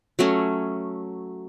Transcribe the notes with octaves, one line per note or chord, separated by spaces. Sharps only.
F#3 A3 C#4